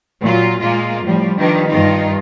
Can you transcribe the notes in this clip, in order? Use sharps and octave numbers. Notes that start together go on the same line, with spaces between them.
A#2 F#3 F4
A#2 G#3 A#3 F4
A2 F3 G3
D#3 F3 G3 D4 D#4 B4
G2 D#3 D#4 F4